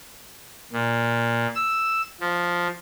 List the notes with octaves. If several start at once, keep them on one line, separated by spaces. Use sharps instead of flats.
A#2
E6
F3